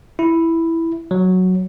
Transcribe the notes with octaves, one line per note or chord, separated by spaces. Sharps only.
E4
F#3